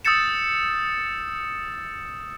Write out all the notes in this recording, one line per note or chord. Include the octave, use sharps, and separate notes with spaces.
D#6 E6 G6 A6 C#7 E7